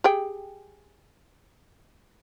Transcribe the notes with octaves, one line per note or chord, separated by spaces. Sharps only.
G4 G#4 G5